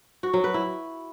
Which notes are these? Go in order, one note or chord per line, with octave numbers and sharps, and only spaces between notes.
F#4
F#3
B4
E4